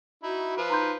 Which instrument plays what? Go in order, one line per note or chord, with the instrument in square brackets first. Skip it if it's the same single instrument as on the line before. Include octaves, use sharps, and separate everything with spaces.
[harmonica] D#4 E4 [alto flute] F#4
[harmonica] F3 B4
[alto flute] D#4 [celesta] A#5 C6 G6